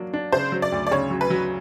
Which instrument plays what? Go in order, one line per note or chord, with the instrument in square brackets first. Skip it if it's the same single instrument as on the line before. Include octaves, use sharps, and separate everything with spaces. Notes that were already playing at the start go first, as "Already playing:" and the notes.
Already playing: [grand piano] F#3 A#3 D4
D4
[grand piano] C#3 [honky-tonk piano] C5
[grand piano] F#3
[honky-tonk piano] D5
[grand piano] D2
[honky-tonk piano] D5
[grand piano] C#3 [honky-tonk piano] C#5
[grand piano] F#3
[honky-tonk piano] B4
[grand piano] F#3